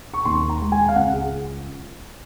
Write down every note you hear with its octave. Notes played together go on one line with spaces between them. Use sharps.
C#6
D#2 C6
A#5
G#3
G#5
F5
C#2 F#5
G#4